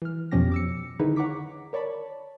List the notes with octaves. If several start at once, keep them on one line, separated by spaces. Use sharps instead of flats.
E3 F6
F2 B2 F3 C#4 G4 A#6
D6 E6 C#7
D3 D#3 D#4 E4 G#4 B4
C#5 F#5 A#5 C#6 D6 B6
A#4 C#5 D5 A5 B5